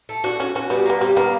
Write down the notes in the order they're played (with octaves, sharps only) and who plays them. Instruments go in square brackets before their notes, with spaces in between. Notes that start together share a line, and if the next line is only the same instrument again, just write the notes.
[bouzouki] A3
[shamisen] D4 [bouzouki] F#4
[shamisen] C#4 [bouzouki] F#4
[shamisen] C#4 [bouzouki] F#4
[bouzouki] G3 [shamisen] B3
[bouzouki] A#3 [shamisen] B3
[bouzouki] G3 [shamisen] C4
[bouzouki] A#3 [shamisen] B3